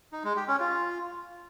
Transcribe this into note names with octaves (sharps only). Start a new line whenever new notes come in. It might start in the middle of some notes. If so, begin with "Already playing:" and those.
D#4
G#3
G4
C#4
F4